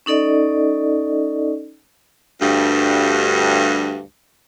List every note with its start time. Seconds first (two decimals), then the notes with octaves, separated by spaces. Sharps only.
0.06 C#4 D#4 A4 D5 D#5
2.42 D2 G2